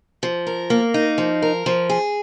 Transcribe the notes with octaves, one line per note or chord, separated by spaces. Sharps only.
F3
A#4
A#3
D#4
F3
A#4
F3
G#4